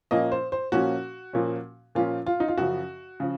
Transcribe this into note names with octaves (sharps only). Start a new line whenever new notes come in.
A#2 F3 A#3 C#4 D#5
C5
C5
A#2 F3 A#3 C#4 F#4
A#2 F3 A#3 C#4
A#2 F3 A#3 C#4 F4
F4
D#4
F4
F#2 C#3 F3 F#4
C#3 F3